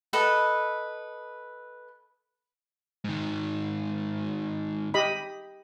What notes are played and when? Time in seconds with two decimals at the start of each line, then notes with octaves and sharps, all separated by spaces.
0.13 A4 B4 D#5
3.04 G#2 D#3
4.94 G4 D#5 B5